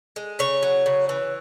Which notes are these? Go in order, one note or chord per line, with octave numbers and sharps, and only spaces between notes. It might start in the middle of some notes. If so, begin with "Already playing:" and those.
G#3
C#3 C#5
F#3
C#3
E3